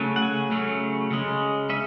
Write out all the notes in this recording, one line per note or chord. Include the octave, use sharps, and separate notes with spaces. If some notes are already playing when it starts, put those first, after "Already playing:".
Already playing: C#3 F#3 A3 C#4
F#5
G#5
C#3 F#3 A3 C#4
C#3 G#3 C#4
C#4 E5